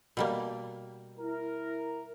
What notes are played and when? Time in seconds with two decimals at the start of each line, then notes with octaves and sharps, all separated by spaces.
0.17 B2 G3 A#3
1.17 E4 A#4